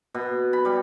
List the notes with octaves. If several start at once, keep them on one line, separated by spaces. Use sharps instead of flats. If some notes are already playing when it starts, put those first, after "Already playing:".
B2
B5
G3